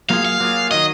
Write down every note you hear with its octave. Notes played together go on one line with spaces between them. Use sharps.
F#3 A#3 F4 G#4 F5
F5
F#3 A#3 F4 G#4
D#3 F#3 D#5